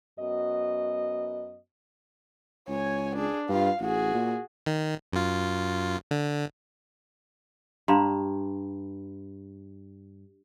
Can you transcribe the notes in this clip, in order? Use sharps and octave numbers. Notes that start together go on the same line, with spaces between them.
F#2 B3 F#4 D#5
C#2 C#5 G#5
D4 G#4
G2 F4 F5
A1 F#4 G#4
A#2
D#3
F#2 F4
D3
G2 F5 A#5 C6